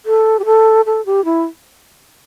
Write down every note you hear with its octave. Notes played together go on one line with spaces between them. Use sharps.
A4
G4
A4
A4
G4
E4